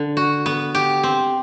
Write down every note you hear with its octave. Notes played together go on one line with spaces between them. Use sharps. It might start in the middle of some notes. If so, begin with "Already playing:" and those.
Already playing: D3
F#4
B3
G4
C4